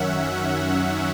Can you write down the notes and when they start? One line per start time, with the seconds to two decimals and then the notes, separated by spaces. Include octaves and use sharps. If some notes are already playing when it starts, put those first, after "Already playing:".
Already playing: F#2 D#3 F#3 C#4 E5 F#5